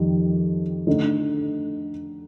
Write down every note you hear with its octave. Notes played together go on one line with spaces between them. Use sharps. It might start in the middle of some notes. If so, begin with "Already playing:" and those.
Already playing: F2 D#3 G3
D3 A3 D#4